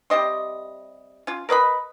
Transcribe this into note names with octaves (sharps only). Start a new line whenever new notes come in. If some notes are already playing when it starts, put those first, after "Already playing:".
C3 G3 D#5 C6
C#4 F4
A#4 B4 D#5 B5